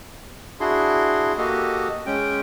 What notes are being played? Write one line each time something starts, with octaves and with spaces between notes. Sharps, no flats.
D4 E4 F#4 G#4 C6
A#3 F#4 G4 A4 D#5
G#3 C#4 G5